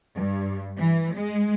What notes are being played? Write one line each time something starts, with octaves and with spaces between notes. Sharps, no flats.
G2
E3
G#3